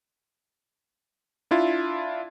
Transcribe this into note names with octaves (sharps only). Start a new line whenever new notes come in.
D4 E4 F4